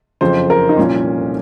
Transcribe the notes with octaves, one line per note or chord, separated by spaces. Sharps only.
F#1 F2 C#3 F3 C5
A#4
D#4
C2 A#2 F3 C#4